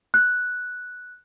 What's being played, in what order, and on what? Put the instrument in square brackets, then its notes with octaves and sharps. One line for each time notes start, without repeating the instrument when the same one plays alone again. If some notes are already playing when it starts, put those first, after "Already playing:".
[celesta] F#6